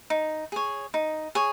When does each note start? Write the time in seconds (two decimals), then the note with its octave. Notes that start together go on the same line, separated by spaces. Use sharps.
0.10 D#4
0.52 G#4 C#5
0.94 D#4
1.35 G#4 C#5